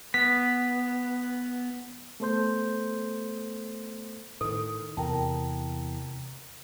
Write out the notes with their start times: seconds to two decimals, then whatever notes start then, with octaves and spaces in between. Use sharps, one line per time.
0.14 B3 B6
2.20 A3 B3 A4 C5 C6 G6
4.41 A2 D#3 A4
4.97 E2 C3 A#4 G5 A5 A#5